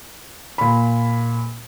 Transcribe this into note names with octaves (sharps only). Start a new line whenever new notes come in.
A#2 B5